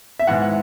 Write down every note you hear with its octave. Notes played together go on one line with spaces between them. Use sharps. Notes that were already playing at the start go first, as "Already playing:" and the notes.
E5
G#2 E3 F#5